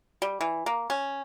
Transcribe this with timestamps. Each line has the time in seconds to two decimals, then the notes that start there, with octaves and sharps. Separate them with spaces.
0.22 G3
0.41 E3
0.66 A#3
0.90 C#4